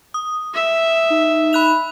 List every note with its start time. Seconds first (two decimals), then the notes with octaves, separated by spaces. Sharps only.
0.14 D#6
0.54 E5
1.10 D#4
1.53 B5 F#6 F7